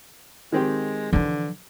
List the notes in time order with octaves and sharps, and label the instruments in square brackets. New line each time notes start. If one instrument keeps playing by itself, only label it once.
[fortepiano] D#3 C4 G4 [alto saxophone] G#3
[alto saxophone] D3 [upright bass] E3 F3